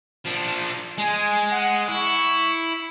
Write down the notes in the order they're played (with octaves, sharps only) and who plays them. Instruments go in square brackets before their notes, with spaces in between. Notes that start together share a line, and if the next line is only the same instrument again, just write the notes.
[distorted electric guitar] F3 D4
[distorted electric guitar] G#3 [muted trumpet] G#5
[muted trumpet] F#5
[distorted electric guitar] E4 [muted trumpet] C#6